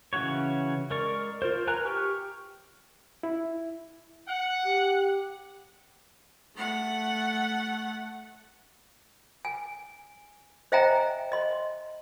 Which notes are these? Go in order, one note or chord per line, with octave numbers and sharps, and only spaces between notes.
C#3 E3 C#4 F#4 C#5
G#3 A#4 D5 C#6
F4 A#4 C5
A#4 B4 G#5 A#5 F#6
G4 G5 C#6 F6
E4
F#5
G4
A3 F#5
G#5
C5 D#5 E5 G5 G#5 A#5
D#5 C6